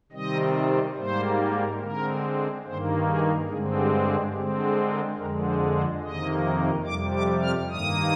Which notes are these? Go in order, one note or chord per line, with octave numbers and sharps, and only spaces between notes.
C3 D#3 G3 C4 D#5
G#2 G3 A#3 C5
D3 G#3 C4 A#4
G2 D#3 A#3 C5
G#4
G2 D3 G#3 C4 G#4
G4
G#4
D3 G#3 C4 G4
G#4
A#4
F2 D3 G#3 A#4
C5
C5
F2 C3 D#3 A#3 D#5
F2 C3 G3 D6
D6
F6
G2 D#3 A#3 D#6